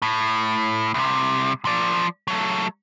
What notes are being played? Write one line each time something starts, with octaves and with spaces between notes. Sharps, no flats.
A2
C2 C3
F3 D5
F#3 A3